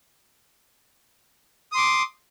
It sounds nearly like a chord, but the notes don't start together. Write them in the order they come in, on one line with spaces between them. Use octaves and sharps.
D#6 C6 D6